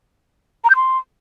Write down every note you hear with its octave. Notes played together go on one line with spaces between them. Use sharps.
A#5
G6
C6